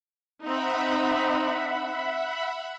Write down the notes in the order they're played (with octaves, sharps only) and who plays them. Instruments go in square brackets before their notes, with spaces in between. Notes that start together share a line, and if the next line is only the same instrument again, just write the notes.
[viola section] C4 D#4 [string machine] E5 F#5 B5